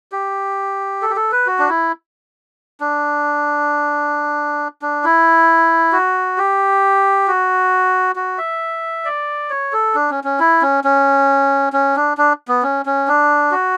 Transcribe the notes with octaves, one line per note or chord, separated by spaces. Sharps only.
G4
A4
G4
A4
B4
F#4
D4
E4
D4
D4
E4
F#4
G4
F#4
F#4
E5
D5
C#5
A4
D4
C#4
C#4
E4
C#4
C#4
C#4
D4
D4
B3
C#4
C#4
D4
F#4